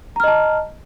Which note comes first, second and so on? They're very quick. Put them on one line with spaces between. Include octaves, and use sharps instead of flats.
A#5 F6 D#5 A5